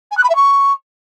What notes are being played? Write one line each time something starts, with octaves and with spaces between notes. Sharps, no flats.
G#5
F#6
B5
E5
C#6